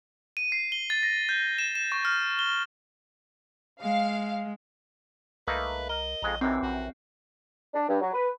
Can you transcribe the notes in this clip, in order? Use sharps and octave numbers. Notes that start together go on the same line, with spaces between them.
D#7
C7
G7
A6
A#6
G6
E7
E7
C#6
F6
G7
G#3 F5
C2 A3 A#3 D#4 B4
A#4 D#5
A#1 F2 G#3 A#5
F#2 C3 E3 C4 D#4
A#1 F#4
D4
G2
F#3
B4